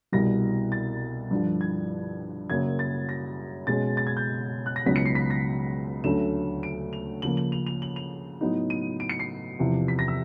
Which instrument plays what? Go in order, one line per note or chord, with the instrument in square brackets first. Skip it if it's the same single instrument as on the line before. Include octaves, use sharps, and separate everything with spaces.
[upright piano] C2 B2 G3 A#6
A6
G2 D3 F3
G#6
F#2 C#3 F#3 A#3 C#4 G#6
A6
A#6
B2 G#3 C#4 A6
A6
G#6
G6
F#6
A#6
C#2 C#3 F#3 B3 D#4 B6
C#7
C7
B6
A#6
D2 D3 F#3 A3 C#4 E7
D7
F7
C#3 F3 A#3 F#7
F#7
F7
F7
F#7
F7
A2 F#3 B3 D#4
D#7
D7
C#7
C7
E2 C3 F3
B6
A#6
E6